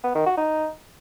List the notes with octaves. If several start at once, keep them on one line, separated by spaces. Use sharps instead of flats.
B3
D#3
F#4
D#4